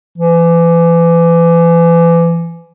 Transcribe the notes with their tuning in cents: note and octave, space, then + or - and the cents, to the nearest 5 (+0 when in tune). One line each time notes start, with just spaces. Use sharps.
E3 +35